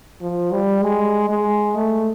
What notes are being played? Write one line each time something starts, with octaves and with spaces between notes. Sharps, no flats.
F3
G3
G#3
G#3
A3